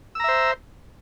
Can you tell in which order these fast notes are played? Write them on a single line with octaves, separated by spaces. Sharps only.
E6 A#5 E5 C5